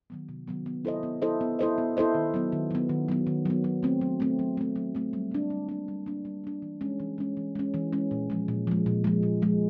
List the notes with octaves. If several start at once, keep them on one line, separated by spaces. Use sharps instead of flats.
D#3 F#3 B3
C3
D#3 F#3 B3
B3
E4 A4 C5 D#5
B3
E4 A4 C5 D#5
B3
E4 A4 C5 D#5
B3
E4 A4 C5 D#5
D#3
F#3 B3
D#3
F#3 B3
D#3
F#3 B3
D#3
F#3 B3
F#3
A3 C4
F#3
A3 C4
F#3
A3 C4
F#3
A3 C4
G3
A#3 D4
G3
A#3 D4
G3
A#3 D4
G3
A#3 D4
E3
G#3 C#4
E3
G#3 C#4
E3
G#3 C#4
E3
G#3 C#4
A#2
F3 G#3
A#2
F3 G#3
A#2
F3 G#3
A#2
F3 G#3